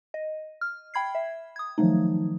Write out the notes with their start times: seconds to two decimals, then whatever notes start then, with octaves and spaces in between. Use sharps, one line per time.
0.14 D#5
0.61 F6
0.94 G5 B5 G#6 C7
1.15 E5
1.56 D#6 G#6
1.78 D#3 F3 F#3 A3 D#4